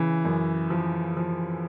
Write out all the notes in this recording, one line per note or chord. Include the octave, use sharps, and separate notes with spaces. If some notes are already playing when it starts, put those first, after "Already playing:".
Already playing: C#3 E3
F#2
F3
F3